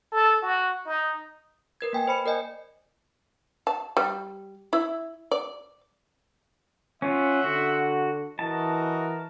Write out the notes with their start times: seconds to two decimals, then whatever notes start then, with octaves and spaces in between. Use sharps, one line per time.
0.12 A4
0.42 F#4
0.86 D#4
1.81 A#4 B4 G#6
1.93 A#3 G5 G#5 G#6
2.08 C5 B5 C#7
2.26 A#4 D5 D#5 G#5
3.67 A5
3.97 G3
4.73 E4
5.31 D5
7.02 C#4 F4 E5 F#5 C6
7.44 D3 F#4
8.39 E3 F#4 A#4 D#5 A5